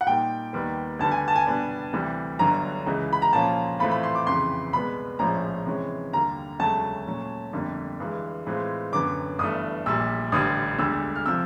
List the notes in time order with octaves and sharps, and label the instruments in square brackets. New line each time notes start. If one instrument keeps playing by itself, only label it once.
[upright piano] F#5
[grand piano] A#2 G3 A#3 D#4 [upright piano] G5
[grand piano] D#2 D#3 G3 B3
[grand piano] D2 D3 G3 B3 [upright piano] A5
[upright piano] G#5
A5
G#5
[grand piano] B2 G3 B3 D4
D2 C3 E3 G3
[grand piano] G1 G2 D3 F#3 [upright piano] A#5
[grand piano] C#2 C#3 E3
[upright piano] B5
A#5
[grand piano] A#2 F3 A#3 C#4 F4 [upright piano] A5
[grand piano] A2 E3 A3 C4 F4 [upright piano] B5
[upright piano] B5
C6
D6
[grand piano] F2 C#3 E3 [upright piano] C6
[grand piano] C2 B2 G#3 B3 [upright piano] B5
[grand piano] A#1 A2 F3 G#3 C#4 [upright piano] A#5
[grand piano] C3 E3 G#3 C#4
[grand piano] D#2 D3 G3 A#3 [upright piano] A#5
[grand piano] E1 D2 C#3 F#3 A3 [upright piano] A5
[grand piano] A#2 F#3 A3 C#4
G1 F2 D3 G3 A#3
G2 E3 G#3
A2 E3 G#3 C4 F4
[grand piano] F#2 D3 F#3 B3 [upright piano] D6
[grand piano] G1 G2 E3 A3 [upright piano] D#6
[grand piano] A#1 A#2 G3 [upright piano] E6
[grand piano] A1 G2 D3 G3 [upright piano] D#6
[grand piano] E1 D2 D3 G3 [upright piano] E6
[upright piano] F6
[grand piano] C3 F3 [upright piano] E6